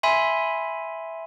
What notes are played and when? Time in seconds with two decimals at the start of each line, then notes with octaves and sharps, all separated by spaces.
0.03 E5 G#5 B5 C6